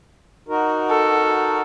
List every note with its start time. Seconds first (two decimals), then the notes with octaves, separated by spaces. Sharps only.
0.48 D#4 F#4 A#4
0.90 A4